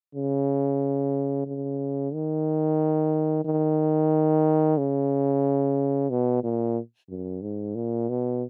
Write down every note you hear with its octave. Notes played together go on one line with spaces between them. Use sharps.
C#3
C#3
D#3
D#3
C#3
B2
A#2
F#2
G#2
A#2
B2